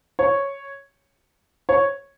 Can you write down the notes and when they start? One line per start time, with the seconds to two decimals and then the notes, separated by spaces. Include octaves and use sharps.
0.19 C#5
1.69 C#5